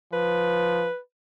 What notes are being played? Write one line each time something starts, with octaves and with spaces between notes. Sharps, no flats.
F3 B4